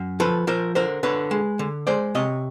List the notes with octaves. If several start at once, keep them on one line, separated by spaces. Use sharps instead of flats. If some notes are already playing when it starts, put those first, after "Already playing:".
Already playing: F#2
F3 A4 B4
F3 A#4 C5
D3 A#4 C5
D3 B4 C#5
G#3
D3
G#3 C5 D5
C3 C#5 D#5